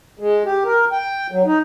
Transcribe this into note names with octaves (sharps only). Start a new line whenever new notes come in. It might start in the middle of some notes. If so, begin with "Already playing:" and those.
G#3
G4
A#4
G5
F#3
D#4